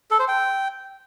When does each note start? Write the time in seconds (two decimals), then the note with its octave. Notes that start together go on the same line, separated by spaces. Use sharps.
0.11 A4
0.19 C5
0.28 G5